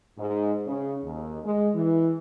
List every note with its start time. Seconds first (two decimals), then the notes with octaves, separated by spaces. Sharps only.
0.18 G#2
0.66 C#3
1.04 D#2
1.44 G#3
1.74 E3